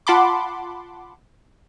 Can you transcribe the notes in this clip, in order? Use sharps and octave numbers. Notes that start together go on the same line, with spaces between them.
F4 F#5 A5 B5 C6 D6